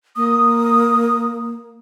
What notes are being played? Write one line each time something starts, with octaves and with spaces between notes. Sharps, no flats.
A#3 D#6